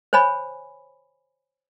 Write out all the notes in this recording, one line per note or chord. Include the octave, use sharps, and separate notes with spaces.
C5 C#5 G#5 B5